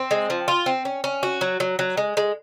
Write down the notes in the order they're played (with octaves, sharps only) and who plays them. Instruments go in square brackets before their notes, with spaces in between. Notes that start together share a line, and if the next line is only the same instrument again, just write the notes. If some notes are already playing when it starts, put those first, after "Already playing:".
Already playing: [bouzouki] C4
G#3
F3
F4
C4
C#4
C#4
F#4
F#3
F#3
F#3
G#3
G#3